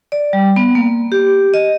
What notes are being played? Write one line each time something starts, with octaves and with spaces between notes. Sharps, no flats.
D5
G3
B3
A#3
G4
D#5